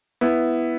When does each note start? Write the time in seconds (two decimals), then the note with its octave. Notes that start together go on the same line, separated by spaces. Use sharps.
0.21 B3 E4